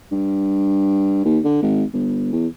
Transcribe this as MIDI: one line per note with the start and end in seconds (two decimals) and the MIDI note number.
0.11 1.23 43
1.25 1.39 39
1.44 1.60 50
1.62 1.84 32
1.93 2.29 31
2.32 2.47 40